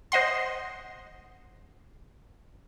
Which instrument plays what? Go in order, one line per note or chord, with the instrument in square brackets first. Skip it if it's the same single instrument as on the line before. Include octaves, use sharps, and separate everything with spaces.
[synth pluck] C5 D#5 F#5 C6